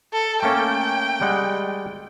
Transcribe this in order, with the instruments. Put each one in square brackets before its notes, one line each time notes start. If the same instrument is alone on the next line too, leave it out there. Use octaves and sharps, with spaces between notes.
[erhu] A4
[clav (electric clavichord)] A3 A#3 C#4 [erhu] G5
[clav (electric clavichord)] G3 G#3 F#5